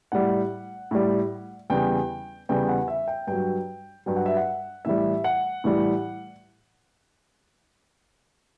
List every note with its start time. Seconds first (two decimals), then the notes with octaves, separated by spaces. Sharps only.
0.12 A2 G3 F#5
0.91 A2 G3
1.70 E2 C#3 G3 G5
2.49 E2 C#3 G3 G5
2.69 F#5
2.88 E5
3.08 G5
3.27 G2 F#3 G5
4.06 G2 F#3 G5
4.16 F#5
4.26 E5
4.37 F#5
4.85 A2 E3 G3 E5
5.24 F#5
5.64 A2 E3 G3